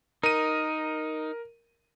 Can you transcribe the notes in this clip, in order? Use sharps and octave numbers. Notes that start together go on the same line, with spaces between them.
D#4 A#4 D#7